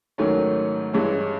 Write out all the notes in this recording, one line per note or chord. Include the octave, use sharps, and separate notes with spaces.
G#2 D#3 F#3 A3 C#4
G2 E3 G#3 C#4